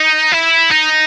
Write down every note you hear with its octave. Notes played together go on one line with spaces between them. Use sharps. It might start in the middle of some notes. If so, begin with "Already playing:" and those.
Already playing: D#4
E4
D#4